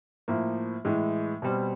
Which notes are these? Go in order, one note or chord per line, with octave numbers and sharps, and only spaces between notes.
A2 F3 A#3
A2 E3 G#3
B2 G3 C4